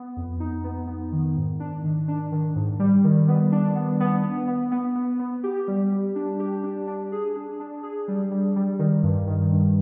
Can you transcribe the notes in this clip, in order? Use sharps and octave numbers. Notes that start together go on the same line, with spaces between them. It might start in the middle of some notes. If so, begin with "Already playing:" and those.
Already playing: B3
F2
D#4
B3
B3
D#3
G#2
D4
D#3
D4
D#3
G#2
G3
D#3
B3
D4
B3
B3
B3
B3
B3
B3
B3
G4
G3
G3
D4
G4
D4
D4
G#4
D4
D4
G#4
G3
G3
G3
D#3
G2
D#3
G2